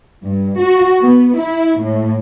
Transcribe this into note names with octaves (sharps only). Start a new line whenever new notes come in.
G2
F#4
B3
E4
A2